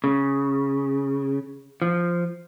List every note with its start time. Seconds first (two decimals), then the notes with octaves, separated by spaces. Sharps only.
0.04 C#3
1.82 F3